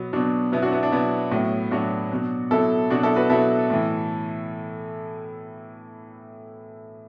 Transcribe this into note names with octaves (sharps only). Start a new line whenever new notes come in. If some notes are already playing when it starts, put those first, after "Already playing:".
Already playing: B2 F#3 B3
B2 F#3 D4
B2 F#3 B3 E4
D4 F#4
B3 E4
D4
B2 F#3 B3 E4
A2 F#3
A2 F#3 D4 F#4
B2 F#3
B2 F#3 E4 A4
B2 F#3 D4 F#4
E4 A4
F#4 B4
B2 F#3 E4 A4
A2 E3